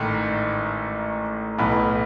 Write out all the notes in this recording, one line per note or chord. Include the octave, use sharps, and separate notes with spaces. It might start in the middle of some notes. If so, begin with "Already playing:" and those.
Already playing: A1 G#2 D#3 A3
B1 A2 E3 B3